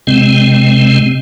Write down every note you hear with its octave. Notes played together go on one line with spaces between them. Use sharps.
C3 G#3 C4